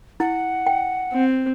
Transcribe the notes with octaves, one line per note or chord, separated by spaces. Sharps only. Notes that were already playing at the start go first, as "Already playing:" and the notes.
E4 F#5
G5
C4